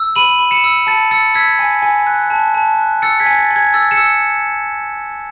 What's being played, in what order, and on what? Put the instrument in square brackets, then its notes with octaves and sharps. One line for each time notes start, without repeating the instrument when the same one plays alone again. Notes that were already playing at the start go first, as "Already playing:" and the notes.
Already playing: [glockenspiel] E6
B5 D#7 F#7
B5
C#7 E7
E6
A5 A6 C#7
E6 A6 C#7
E6 G#6 B6
G#5
G#5
F#6
A5
A5
F#6
E6 A6 C#7
G#6 B6
G#5
A6
G#5
G#6
E6 A6
C#7 E7
E6